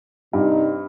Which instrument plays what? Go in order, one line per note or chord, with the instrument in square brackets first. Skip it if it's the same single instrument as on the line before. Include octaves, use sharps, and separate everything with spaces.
[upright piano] G2 [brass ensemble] C3 G3 C4 D#4